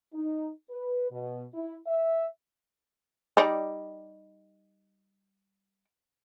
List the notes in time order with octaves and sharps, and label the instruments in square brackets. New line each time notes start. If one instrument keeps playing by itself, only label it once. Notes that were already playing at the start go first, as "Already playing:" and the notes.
[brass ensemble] D#4
B4
B2
E4
E5
[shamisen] G3 D#4 D5